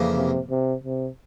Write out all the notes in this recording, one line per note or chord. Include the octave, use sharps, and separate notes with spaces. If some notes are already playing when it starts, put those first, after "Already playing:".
Already playing: F2 C#3 E3 A#3
C3
C3
C3